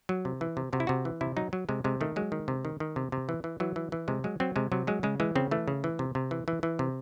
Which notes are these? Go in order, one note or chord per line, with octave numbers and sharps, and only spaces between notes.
F#3
C3
E3
C3
C3 F#4
E4
C3 F#4
E3
C3 E4
F#3 D#4
F#3
C3 G#3
C3 G#3
D#3 A3
F#3 G#3
D#3
C3
D#3
D#3
C3
C3
E3
E3
E3 F#3
E3
E3
C3 G#3
F#3 G#3
F#3 C4
C3 G#3
C3 F#3
F#3 G#3
C#3 G#3
E3 G#3
C#3 C4
E3 A3
C#3
E3
C3
C3
E3
E3
E3
C3